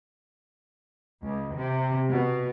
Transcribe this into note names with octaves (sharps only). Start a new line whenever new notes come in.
C#2
C3
B2